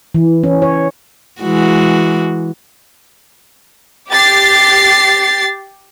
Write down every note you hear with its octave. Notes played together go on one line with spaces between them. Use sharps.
E3
C#4
C#5
E3 G#3 F#4
G4 A6 C7